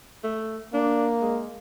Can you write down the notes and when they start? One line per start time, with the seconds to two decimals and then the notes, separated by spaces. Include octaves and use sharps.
0.24 A3
0.74 A#3 D4
1.22 G#3